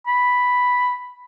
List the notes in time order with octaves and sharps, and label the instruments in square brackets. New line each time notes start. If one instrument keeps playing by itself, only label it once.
[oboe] B5